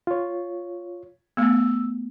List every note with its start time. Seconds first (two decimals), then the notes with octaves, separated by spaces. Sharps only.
0.07 F4 C#5
1.37 A3 B3 E6